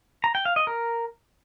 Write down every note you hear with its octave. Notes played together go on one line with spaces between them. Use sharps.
A#5
G5
F5
D#5
A#4